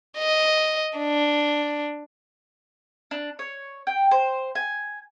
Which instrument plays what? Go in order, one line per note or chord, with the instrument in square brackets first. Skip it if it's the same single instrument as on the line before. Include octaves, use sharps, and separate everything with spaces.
[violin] D#5
D4
[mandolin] D4
C#5
G5
C5
G#5